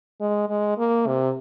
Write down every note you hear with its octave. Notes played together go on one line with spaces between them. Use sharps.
G#3
G#3
A#3
C3